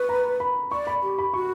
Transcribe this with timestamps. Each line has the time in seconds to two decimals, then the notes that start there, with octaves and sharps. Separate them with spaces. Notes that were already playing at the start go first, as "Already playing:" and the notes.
Already playing: B4 B5 C#6
0.09 A#5
0.40 B5
0.71 D5 C#6
0.87 B5
1.03 G4
1.18 B5
1.34 F#4 C#6